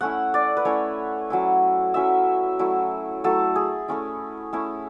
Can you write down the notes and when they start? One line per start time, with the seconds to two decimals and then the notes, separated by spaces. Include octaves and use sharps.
0.01 A3 C#4 E4 F#5
0.34 D5
0.57 B4
0.65 A3 C#4 E4 C#5
1.30 F#3 C#4 E4
1.94 F#3 C#4 E4 E5
2.59 F#3 A3 E4
3.24 F#3 A3 E4 A4
3.56 G#4
3.88 A3 C#4 E4
4.53 A3 C#4 E4